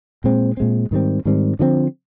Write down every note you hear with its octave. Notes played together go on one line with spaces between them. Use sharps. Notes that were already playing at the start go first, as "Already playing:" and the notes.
A#2 G#3 C4
A#2 G#3 C4
G#2 D#3 G3 C4
G#2 D#3 G3 C4
D3 F3 G#3 C4